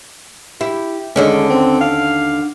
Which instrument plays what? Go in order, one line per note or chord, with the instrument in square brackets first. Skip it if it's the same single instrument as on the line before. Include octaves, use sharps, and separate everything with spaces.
[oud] E4 [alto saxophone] G4
[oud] D#2 D3 C#4 [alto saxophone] G#3
[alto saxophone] C4
F5